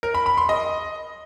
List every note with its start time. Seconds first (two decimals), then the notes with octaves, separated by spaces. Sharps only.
0.03 A#4
0.14 B5
0.26 B5
0.37 C6
0.49 D#5